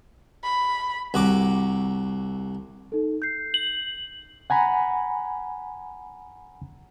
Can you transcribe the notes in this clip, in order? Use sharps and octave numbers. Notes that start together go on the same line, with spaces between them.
B5
C2 F#4 A#5 D6
D#4 A4
G6 C7
F#7
F#5 G#5 A#5 B5